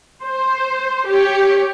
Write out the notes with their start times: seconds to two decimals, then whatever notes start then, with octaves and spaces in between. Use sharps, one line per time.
0.23 C5
1.07 G4 C#5